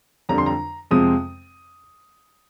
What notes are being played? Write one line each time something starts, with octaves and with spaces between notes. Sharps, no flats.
F2 D3 G3 A#5
C6
A#5
F2 C3 F3 G#3 C4 D#6